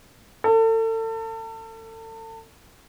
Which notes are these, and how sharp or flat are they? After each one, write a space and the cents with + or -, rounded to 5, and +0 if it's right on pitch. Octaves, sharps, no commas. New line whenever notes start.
A4 +35